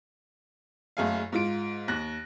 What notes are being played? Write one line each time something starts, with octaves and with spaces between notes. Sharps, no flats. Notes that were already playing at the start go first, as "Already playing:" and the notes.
F#1 F#2 A3 G#4 F5
G#2 F4 D7
D#2 F#6 A#6